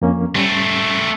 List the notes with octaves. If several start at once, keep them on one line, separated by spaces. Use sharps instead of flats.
F2 A#3 C#4
G3 A3 C4 C#4